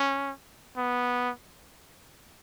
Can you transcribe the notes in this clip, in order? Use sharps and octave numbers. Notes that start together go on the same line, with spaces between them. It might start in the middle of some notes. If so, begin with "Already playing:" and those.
Already playing: C#4
B3